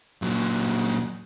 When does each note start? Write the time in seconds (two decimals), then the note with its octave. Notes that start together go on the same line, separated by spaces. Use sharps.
0.22 A#2 F#3